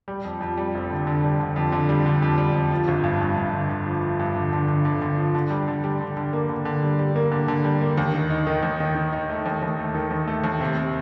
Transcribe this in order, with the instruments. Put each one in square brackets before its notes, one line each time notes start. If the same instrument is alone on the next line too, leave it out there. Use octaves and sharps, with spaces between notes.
[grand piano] G3
F2
F2
G3
F1
D3
D3
G3
D3
F2
D3
G3
D3
F2
G3
F2
F3
G1
G2
G2
G2
D3
D3
F3
F3
G2
D3
D3
D3
D3
D3
F3
D3
G3
D3
G3
D3
D3
A#3
D3
D3
G3
G3
A#3
D3
D3
G3
A#3
D#2
D#3
D#4
D#3
D#2
D#3
D#3
D#4
A3
D#2
D#2
A3
D#3
D#2
A3
D#2
C3
C3